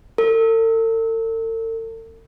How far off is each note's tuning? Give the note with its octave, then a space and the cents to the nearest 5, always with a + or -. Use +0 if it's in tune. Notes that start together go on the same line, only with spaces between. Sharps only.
A4 +45